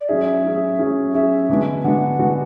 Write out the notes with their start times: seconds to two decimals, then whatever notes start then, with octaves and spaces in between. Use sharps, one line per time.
0.01 D5
0.09 F#3 C#4 G#4 E5
0.44 F#3 C#4 G#4
0.79 F#3 C#4 G#4
1.14 F#3 C#4 G#4 E5
1.49 D3 G#3 B3 D4 F#4
1.84 D3 G#3 B3 D4 F#4 F#5
2.19 D3 G#3 B3 D4 F#4